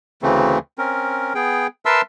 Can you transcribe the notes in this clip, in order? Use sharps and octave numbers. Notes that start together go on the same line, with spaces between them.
D2 C#3 E3 A3 C4
C4 C#4 A#4
B3 G#4 G5
A#4 B4 E5 A5 C6 E6